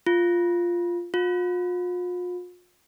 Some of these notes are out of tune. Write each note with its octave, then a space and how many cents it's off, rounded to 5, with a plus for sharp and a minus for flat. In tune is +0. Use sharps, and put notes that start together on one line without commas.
F4 -5
F4 +40